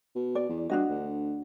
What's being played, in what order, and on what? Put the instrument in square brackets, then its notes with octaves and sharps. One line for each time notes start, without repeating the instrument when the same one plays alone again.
[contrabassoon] B2
[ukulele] D5
[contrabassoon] E2
[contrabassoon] G2 [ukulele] D4 F#4 D#5
[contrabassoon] D2